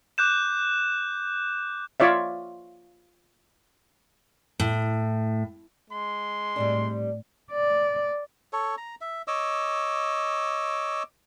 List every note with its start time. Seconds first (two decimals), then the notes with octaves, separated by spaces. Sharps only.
0.18 D6 F#6 G6 E7
2.00 F4 C#5 D5 E5
4.60 A2
5.91 G#3 C6
6.56 A2 G3 C4 D4
7.52 D5
8.53 A4 C#5
8.78 A#5
9.01 E5
9.28 C#5 D#5 D6 E6